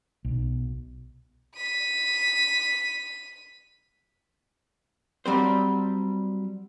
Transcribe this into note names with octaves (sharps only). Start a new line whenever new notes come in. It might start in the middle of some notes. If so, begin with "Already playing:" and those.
B1
B6 D#7
F#3 G3 C4 C5